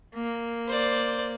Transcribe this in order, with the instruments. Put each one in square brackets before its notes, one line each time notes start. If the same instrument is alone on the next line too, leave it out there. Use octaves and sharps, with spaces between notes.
[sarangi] A#3
[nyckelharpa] C5 D5